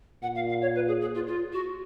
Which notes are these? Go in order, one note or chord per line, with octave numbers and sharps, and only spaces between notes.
A#2 F#5
F5
F5
C#5
B4
G#4
G#4
F4
F4
F#4